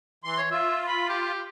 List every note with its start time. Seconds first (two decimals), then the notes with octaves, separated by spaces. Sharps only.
0.24 E3 C6
0.38 C#5
0.51 F4 E5
0.87 B5
1.09 G4